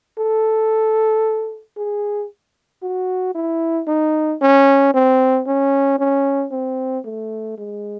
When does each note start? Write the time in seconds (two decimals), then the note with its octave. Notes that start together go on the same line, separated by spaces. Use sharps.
0.18 A4
1.77 G#4
2.82 F#4
3.35 E4
3.88 D#4
4.42 C#4
4.94 C4
5.47 C#4
5.99 C#4
6.52 C4
7.05 A3
7.58 G#3